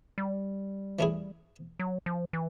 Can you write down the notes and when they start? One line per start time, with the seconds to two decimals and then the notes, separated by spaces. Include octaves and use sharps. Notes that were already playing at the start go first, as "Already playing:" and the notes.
0.18 G3
0.99 E3 A3 C#4 E4 G#4
1.79 F#3
2.06 F3
2.33 E3